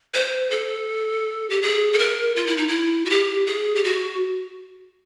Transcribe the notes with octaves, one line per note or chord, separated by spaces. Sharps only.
C5
A4
G4
G#4
A4
A#4
F4
E4
D#4
E4
F#4
G4
G#4
G4
F#4